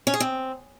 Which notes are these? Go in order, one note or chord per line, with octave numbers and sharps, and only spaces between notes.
C#4
G#4
C4